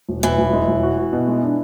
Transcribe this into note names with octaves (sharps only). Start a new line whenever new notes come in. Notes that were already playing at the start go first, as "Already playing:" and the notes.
E1
E1 E3
E1
G#3
E1
F#4
F#4
B2
G#3
D4